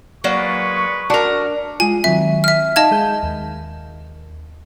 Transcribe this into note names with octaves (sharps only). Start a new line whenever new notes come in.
F#3 G#3 A#3 B4 D5 C#6
D4 F#4 A#4
G#3 F4 G#5
D#3 F#3 C4 E5
E5 F6
D#4 D#5 F5 A5 G#6
G#3 G#4 G6
D#2